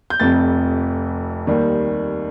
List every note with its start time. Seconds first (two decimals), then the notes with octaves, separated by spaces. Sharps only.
0.10 G6
0.20 F1 F2 C3 A6
1.47 D#2 D#3 G3